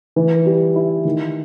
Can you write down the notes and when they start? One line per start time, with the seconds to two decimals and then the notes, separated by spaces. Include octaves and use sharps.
0.16 E3
0.46 G3
0.76 E4
1.05 D#3